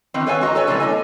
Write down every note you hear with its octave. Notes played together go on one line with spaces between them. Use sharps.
D#3 E3 B3 C4
A4 B4 C#5 E5 F5 G#5
G#3 F#4 D#5 A#5
A4 B4 C#5 G#5
C3 E3 G3 A3 G#4 A4
A#3 E4 D#5 G#5